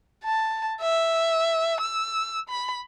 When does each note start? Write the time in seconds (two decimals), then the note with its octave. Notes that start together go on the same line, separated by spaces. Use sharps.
0.24 A5
0.81 E5
1.81 E6
2.49 B5